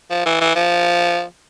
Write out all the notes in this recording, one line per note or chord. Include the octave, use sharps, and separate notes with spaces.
F3
E3
E3
F3